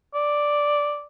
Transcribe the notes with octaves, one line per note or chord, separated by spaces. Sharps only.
D5